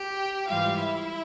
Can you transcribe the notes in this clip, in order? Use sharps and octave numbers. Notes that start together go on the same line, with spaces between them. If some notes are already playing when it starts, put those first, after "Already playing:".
Already playing: G4 G5
G#2 E3 G3 F4 F5
E4 E5